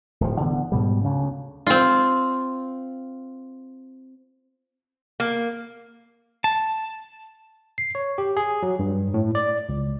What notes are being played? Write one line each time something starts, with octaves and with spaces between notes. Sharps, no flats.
D1 A2 F3
D3 E3 B3
G#2 B2 G3
D2 C#3
C4 F4
A#3
A5
C7
C#5
G4
G#4
F#3
G2
A2
D5
C#2